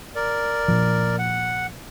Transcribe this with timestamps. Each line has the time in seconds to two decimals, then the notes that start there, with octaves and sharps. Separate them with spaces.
0.15 A#4 D5
0.68 A#2 F3
1.19 F#5